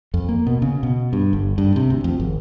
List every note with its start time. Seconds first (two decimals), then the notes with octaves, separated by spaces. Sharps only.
0.14 F2
0.29 A#3
0.47 B2
0.62 C#3
0.83 B2
1.13 G2
1.33 G1
1.58 G2
1.76 C3
1.90 D2
2.04 F2
2.20 G#1